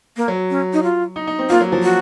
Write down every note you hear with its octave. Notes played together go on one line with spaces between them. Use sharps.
A#3
F#3
C#4
D#4
F4
D#4
D#4
C4
A#3 F4
F#3
F3
F#4